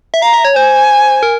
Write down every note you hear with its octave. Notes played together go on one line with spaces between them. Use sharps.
E5
F5 A#5
E5
C#5
C5 G#5
A#4